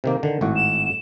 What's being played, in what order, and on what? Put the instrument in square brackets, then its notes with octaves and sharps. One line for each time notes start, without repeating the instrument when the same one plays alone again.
[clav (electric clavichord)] C3 D#3 A#3
D3 D#3
G#1 A2 F#4
[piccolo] E7